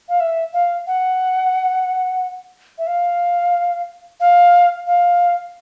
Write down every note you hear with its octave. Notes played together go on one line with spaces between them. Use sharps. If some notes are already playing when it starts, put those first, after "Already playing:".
F5
E5
F5
F#5
E5
F5
F5
F5